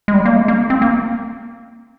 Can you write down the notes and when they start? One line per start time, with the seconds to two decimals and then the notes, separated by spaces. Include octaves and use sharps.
0.08 G#3
0.14 G3
0.25 A#3
0.36 G#3
0.48 A#3
0.70 C4
0.82 A#3